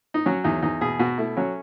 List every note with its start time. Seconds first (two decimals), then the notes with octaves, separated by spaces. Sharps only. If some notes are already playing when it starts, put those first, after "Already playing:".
0.14 D#4
0.26 F#3 C#4
0.44 E2 D#4
0.62 E2 D#4
0.81 B2 G#4
0.99 B2 F#4
1.18 A3 E4
1.37 F#3 C#4